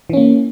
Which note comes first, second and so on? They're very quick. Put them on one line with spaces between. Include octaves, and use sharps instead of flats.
E3 C#4 A#3